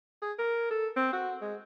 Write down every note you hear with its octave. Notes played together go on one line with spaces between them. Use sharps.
G#4
A#4
A4
C4
F#4
G#3